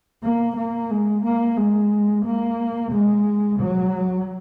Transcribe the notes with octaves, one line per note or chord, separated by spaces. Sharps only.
A#3
A#3
G#3
A#3
G#3
A#3
G#3
F#3